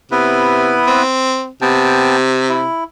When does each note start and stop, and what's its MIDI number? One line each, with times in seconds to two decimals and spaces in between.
0.11 0.76 48
0.11 1.03 59
0.11 1.03 64
0.11 1.03 71
0.87 1.48 60
1.62 2.67 48
1.62 2.16 59
1.62 2.16 79
1.62 2.16 81
2.49 2.84 64